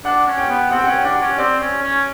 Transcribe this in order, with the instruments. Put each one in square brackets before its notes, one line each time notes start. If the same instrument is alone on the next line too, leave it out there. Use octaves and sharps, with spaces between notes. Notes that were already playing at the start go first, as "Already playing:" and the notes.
[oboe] D4 [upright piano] F#5
[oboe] C#4
[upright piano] G5
[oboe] B3
[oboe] C4 [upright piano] F#5
[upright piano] G5
[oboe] C#4 [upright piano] F#5
[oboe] D4 [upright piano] F#5
[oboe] C#4
[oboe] C4 [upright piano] D5
[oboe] C#4
C#4